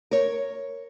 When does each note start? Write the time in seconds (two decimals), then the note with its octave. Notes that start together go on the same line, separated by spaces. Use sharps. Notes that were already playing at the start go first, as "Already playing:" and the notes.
0.11 A#4 C#5